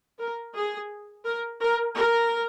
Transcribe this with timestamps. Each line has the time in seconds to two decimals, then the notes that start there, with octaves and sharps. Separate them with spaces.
0.20 A#4
0.55 G#4
1.25 A#4
1.61 A#4
1.96 A#4